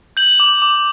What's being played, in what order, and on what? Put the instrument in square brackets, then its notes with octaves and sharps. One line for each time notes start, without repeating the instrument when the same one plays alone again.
[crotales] G6 F#7
D6
D6